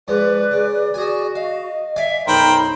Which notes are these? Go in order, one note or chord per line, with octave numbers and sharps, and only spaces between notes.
G#2 F3 B4 D5
C#3
F#4 G#4 G#5
D#5 F5
D5 E5 F5 G#5
B1 F#2 D#4 A#4 C5 G5 B5